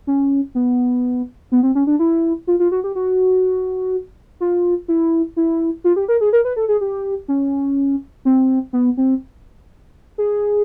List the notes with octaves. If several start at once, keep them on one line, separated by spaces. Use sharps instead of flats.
C#4
B3
B3
C4
C#4
D4
E4
F4
F4
F#4
G4
F#4
F4
E4
E4
F4
G4
A#4
G#4
A#4
B4
A4
G#4
G4
C#4
C4
B3
C4
G#4